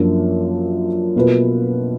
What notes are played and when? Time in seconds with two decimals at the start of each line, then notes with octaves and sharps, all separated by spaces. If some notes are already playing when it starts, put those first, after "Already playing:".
Already playing: F#2 F3 A#3 D4 F4
1.16 B2 A#3 F4 B4